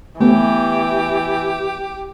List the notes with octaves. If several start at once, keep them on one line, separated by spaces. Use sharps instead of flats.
E3 A3 B3 G4